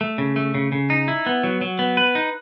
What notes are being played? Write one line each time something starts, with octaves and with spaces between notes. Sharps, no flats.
A3
C#3
A3
C#3
C#3
D#4
E4
B3
F#3
F#3
B3
B4
D#4